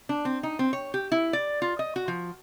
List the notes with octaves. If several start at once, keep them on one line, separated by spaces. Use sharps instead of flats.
D4
C4
D#4
C4
C#5
G4
E4
D5
F4
D#5
F#4
F3